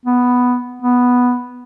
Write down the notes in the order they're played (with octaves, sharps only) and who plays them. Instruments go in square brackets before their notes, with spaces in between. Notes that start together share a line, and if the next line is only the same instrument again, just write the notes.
[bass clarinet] B3
B3